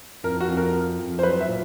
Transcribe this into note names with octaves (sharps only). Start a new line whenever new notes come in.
F2 A#4
F#4
F2
A#4
F2
F2
C5
F#3 B4
E5
A#2